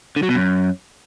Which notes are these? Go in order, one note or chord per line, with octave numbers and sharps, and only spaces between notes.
D3
F#3
B2
F#2